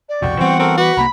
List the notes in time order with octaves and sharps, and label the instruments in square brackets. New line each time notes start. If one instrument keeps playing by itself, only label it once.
[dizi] D5
[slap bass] C2 F2 B2 [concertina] F#4 G5 C#6
[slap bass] E3 G3 B3 [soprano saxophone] C4 [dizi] F#5
[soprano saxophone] C4 [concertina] F#4 A4 A#4
[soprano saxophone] F#4 [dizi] B4 [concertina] D6
[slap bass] C2 F#3 A#3 [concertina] F#5 A#5 F#6 [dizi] B5